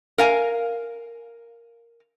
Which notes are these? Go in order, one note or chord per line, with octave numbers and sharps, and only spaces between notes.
A#4 F5 G#5